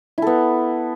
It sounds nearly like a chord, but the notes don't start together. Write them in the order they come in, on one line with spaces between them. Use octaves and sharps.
E4 A4 B3